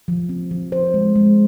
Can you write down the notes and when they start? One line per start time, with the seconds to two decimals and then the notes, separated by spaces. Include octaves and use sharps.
0.08 F3
0.29 C4
0.51 F3
0.72 C5
0.94 G#3
1.16 G#3